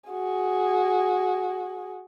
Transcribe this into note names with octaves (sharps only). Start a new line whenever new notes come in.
F#4 G#4